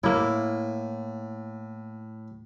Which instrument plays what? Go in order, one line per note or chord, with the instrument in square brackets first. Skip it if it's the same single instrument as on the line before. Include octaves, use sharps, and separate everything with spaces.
[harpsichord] A2 [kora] A#3 E4